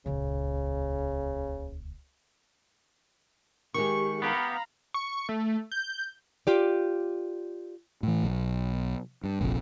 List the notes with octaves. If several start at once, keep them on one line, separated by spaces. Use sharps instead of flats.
D#1 C#2 C#3
D#3 G#3 G4 C#6
B3 G4 F5 A#5 B5
C#6
A3
G6
F4 G4 D5
A2 E3
B1
G2
F1 A#1 F2